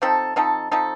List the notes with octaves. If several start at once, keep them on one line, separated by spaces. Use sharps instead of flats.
F3 C4 D#4 A4
F3 C4 D#4 A4
F3 C4 D#4 A4